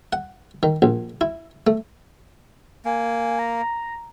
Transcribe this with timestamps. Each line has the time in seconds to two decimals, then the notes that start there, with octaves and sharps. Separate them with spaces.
0.13 F#5
0.63 D#3
0.82 A#1
1.21 E4
1.67 A3
2.85 A#3 G#5
3.39 A#5